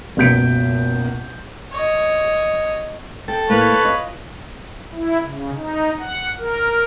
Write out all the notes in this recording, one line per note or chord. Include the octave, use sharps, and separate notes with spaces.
F#1 C#2 B2 G6 B6 D7
C#5 D#5
A4 G5
A2 A#3 B4 C#5
F4 D#5
E4
C#3
D#4
F#5
A#4